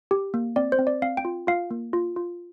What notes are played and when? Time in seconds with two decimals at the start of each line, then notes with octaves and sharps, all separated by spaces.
0.11 G4
0.34 A#3
0.56 C4 D5
0.72 C5
0.79 C4
0.87 D5
1.02 C4 F5
1.17 G5
1.25 F4
1.47 F4 F5
1.71 A#3
1.93 F4
2.16 F4